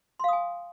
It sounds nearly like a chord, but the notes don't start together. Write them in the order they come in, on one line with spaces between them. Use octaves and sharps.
C6 F5 D#6 G#5